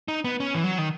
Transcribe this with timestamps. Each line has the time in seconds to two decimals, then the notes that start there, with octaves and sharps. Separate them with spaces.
0.08 D#4
0.24 B3
0.40 C#4
0.54 E3
0.64 F#3
0.78 D#3